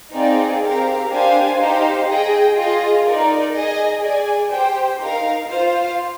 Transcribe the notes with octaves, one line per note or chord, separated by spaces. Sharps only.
C4 D#4 G#4 D5 F5
C4 G4 A#4 F5
D4 G4 C5 F5 G#5
D#4 G4 C5 F5
G#4 D#5 G5
F4 G#4 D#5
D#4 A#4 D5
G#4 D#5 G#5
G#4 D5 G#5
G4 C5 G5
D#4 A#4 F5
F4 C5 F5